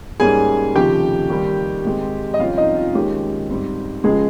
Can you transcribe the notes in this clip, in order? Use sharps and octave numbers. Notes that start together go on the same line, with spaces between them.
G#2 G3 A#3 C#4 G#4 G#5
F1 D#2 C#3 F3 G4 G5
D#2 D#3 G3 C4
G#2 D#3 G#3 C4
D#5
F2 C3 G3 C#4 F4 F5
D#4 D#5
F4
D#2 D#3 G#3 C#4 G4
G#2 G3 C4
C#2 C#3 F3 G#3 G#4